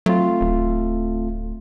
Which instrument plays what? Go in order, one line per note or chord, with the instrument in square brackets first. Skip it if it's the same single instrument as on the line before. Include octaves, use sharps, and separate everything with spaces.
[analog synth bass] F#3 [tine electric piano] A3 C4 F4
[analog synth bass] D1